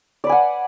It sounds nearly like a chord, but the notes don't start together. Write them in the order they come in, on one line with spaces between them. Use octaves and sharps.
D5 B4 G#5 F#5